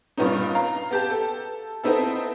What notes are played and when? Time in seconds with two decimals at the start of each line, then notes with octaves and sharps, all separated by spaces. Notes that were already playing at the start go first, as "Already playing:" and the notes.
0.17 G2 A#2 B3 C#4 D#4
0.55 F5 A#5
0.91 B3 G4 A5
1.10 A4
1.84 B3 C4 D#4 E4 A4